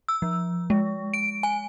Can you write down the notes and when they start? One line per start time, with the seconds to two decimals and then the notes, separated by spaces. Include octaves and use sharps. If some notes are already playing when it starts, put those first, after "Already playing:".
0.09 E6
0.22 F3
0.70 G#3
1.14 D7
1.43 G#5